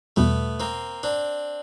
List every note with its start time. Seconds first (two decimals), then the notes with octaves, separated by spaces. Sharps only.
0.16 E2 B2 G3 A3 B3
0.60 A#3 C4
1.03 C4 D4